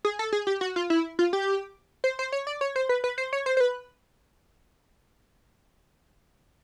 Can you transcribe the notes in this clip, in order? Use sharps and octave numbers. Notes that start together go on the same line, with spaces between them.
G#4
A4
G#4
G4
F#4
F4
E4
F4
G4
C5
C5
C#5
D5
C#5
C5
B4
B4
C5
C#5
C5
C5
B4